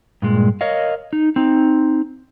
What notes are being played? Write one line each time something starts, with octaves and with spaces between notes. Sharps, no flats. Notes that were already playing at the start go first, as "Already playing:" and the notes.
G2 A#2 G#3
A#4 C#5 D#5 F5
D#4
C4 D#4